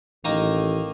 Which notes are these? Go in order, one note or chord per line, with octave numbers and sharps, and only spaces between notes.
A1 D#3 A#3 D#4